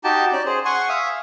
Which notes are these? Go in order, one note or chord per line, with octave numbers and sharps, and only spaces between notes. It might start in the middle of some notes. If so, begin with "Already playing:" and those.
D#4 F#4 G4 G5 A5
C#4 D5
G#4 C5
F#5 G#5 C6 C#6
E5 F5 G#5 D#6